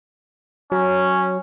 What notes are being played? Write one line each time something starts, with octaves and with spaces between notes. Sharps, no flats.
F#3 C#4